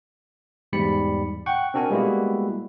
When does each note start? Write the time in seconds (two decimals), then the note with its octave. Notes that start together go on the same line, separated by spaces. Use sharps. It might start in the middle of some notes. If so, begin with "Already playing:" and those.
0.73 E2 G#2 G3 D5 B5 C#7
1.46 F#5 G5 C#6
1.74 C4 D4 F#4 A#4 G#5
1.90 G3 G#3 A#3 B3 E4 F#4